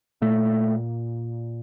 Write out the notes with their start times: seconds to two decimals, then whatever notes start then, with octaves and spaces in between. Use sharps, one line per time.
0.22 A#2 A3